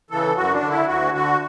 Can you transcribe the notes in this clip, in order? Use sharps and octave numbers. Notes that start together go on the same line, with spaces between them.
C#3 E3 A4
F#2 F#4
D4
D3
E4
D2 F#4
D3 F#4